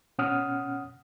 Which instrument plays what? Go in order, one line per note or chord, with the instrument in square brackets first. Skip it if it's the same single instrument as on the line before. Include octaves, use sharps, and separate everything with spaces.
[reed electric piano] B2 C#4 F#5 D#6 F6